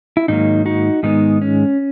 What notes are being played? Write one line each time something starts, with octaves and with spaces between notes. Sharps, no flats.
E4
G#2 D#3 F#3 A#3 D#4
D#4 F#4
G#2 D#3 G#3 B3 D#4
C#4